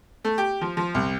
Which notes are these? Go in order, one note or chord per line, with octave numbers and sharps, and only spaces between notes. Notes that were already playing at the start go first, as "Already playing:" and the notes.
A3
G4
F3
F3
C2